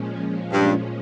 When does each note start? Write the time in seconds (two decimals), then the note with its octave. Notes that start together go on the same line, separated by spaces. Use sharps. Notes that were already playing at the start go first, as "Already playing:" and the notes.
Already playing: A#2 F3 G#3 C#4
0.52 G2